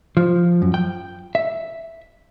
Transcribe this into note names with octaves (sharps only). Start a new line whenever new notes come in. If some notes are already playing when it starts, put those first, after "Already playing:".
F3
F#2
G5
E5